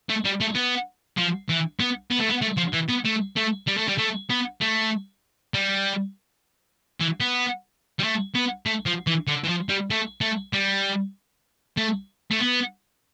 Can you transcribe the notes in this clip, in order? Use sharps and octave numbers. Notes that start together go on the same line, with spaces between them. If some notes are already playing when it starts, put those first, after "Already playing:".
A3
G3
A3
B3
F3
E3
B3
B3
A3
B3
A3
F3
E3
B3
A3
A3
G3
A3
G3
A3
B3
A3
G3
E3
B3
G3
A3
B3
A3
F3
E3
D3
E3
F3
G3
A3
A3
G3
A3
A3
B3